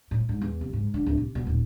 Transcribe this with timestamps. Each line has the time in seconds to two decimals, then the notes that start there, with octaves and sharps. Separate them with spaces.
0.11 A2
0.29 G#2
0.41 E2
0.61 C3
0.73 G#2
0.94 D3
1.06 D1
1.18 C3
1.35 B2
1.47 D#1